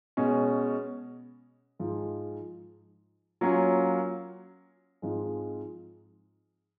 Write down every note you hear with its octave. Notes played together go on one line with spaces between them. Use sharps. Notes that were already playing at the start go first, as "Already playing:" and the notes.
B2 G#3 C#4
G#2 F3 G#3
F#3 A#3 C#4 F4
G#2 F3 G#3 C4